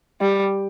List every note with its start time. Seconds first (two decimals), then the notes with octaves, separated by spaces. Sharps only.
0.21 G3